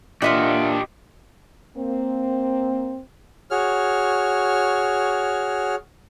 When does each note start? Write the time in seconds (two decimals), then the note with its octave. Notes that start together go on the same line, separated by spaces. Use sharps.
0.22 A#2 D4 F4 G4 D#5 E5 F#5
1.77 A#3 C4
3.50 F#4 G#4 C#5 F6